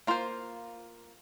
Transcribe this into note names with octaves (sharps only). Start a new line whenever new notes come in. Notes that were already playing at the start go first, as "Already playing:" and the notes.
A#3 F4 C5